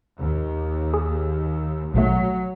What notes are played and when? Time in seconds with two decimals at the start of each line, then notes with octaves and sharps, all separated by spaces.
0.18 D#2
0.94 G#4
1.94 A#1 B2 F#3 A3